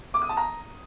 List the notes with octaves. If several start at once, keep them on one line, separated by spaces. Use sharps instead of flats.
D6
D#6
A5
A#5